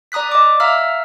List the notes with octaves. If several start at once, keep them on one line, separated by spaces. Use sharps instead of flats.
D5 A#5 D#6 F#6 B6
D#5 D6
E5 F5 A#5 E6 F6